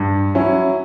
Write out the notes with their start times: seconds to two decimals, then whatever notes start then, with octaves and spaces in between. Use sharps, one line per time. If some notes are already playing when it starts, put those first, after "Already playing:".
Already playing: G2
0.35 F#3 C#4 E4